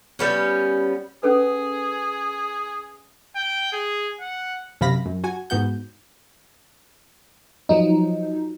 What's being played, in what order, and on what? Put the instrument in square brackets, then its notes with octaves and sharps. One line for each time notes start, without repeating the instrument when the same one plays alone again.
[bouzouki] G3 B3 C#4
[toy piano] C#4 A4 B4 [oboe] G#4
[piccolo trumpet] G5
G#4
F#5
[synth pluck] F#2 C3 F5 B5 A#6 B6
F#2
F#4 G#5
G#2 B3 F#4 G6
[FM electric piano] F3 F#3 D#4